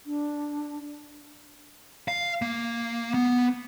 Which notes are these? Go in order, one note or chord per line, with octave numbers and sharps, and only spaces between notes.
D4
F5
A#3
B3